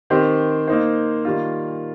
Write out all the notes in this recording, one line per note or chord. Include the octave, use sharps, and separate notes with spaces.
D#3 C4 G4 C5
A#3 D#4 C5
D#3 G3 A#3 F4